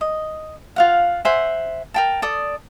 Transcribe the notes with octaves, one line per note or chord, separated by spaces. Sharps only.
D#5
F4 F5 F#5
C5 E5 F#5 G#5
A#4 G5 A5
A4 D5 D#6